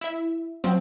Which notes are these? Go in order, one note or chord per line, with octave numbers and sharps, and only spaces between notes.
E4 E5
F3 F#3 C4